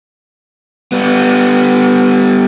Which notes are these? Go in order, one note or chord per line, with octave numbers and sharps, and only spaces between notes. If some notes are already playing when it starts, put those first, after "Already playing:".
G3 B3